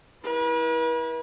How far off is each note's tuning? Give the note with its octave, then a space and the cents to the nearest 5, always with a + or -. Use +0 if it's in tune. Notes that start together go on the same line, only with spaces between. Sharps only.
E4 -15 B4 -40